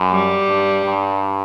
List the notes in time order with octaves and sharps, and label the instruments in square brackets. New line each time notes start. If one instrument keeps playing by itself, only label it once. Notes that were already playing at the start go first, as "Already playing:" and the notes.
Already playing: [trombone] F#2
[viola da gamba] G3
[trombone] G2
G2